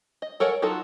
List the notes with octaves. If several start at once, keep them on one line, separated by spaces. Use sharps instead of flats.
D#5
A4 A#4 C#5 F#5 G#5
F#3 D#4 F4 F#4 A4